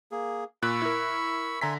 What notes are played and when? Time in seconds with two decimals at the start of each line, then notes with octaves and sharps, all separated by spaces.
0.11 A#3 G#4
0.63 A#2 B5 C#6 E6 F#6
0.82 E4 A#4
1.61 D3 E5 G#5 A#5 C6 B6